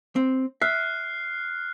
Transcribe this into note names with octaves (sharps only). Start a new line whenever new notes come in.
C4
E5 F6 F#6 C7